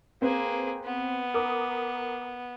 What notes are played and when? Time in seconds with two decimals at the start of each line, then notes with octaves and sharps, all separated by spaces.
0.22 A#3 C4 G#4 B4
0.84 B3
1.34 A#4 D6 D#6